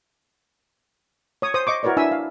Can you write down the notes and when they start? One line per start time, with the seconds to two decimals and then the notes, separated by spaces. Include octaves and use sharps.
1.42 C#5 D#6
1.54 C5 D#6
1.67 D#5 C#6 D6
1.83 E4 F#4 A#4 B4 C#5 D5
1.97 D4 E4 E5 G#5 E6
2.11 F5